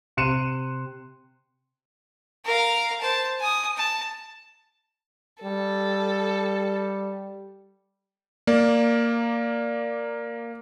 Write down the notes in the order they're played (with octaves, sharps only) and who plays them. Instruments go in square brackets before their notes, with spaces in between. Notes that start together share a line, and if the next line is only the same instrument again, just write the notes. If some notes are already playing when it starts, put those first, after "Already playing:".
[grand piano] C3 C6 F#6 C#7 D#7 E7
[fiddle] A#4 F5
C5 A5
G#5 D#6
A5
[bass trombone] G3 [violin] A4
[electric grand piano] A#3 D5